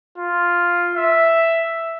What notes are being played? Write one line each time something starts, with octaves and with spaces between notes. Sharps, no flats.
F4
E5